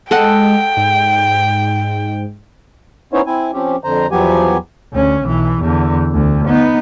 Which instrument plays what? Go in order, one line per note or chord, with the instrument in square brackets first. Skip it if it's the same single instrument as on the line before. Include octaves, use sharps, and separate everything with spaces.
[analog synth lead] G#3 [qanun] A4 D#5 F#5 [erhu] G5
[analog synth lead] G#2
[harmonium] B3 C#4 D#4 E4 C5 C#5
C4 E4 G#5
F3 C4 C#4 G4
F2 D3 C5 A#5
E2 F3 F#3 B3 G4 G#5
[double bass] D2 C#4
B1 E3
E2 D3
D2
B3 D#4